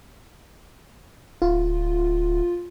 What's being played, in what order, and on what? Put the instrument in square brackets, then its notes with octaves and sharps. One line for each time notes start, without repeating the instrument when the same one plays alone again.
[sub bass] D1 [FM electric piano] F4